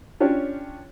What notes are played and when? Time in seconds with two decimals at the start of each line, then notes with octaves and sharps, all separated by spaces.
0.20 C#4 D4 F4 G4 C#5